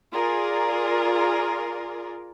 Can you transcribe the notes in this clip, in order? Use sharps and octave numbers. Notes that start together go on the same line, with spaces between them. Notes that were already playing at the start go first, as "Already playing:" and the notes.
F4 G#4 A#4 D5